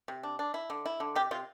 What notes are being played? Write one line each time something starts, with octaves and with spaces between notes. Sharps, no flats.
C3
D4
D4
E4
D3
E4
D3
C3 G4
C3 F4